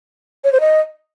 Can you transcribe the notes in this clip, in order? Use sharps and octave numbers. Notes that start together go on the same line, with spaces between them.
C#5
C5
D#5